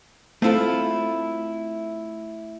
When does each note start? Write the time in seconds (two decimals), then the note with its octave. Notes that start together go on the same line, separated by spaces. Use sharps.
0.42 A3 C4 E4 F4 A4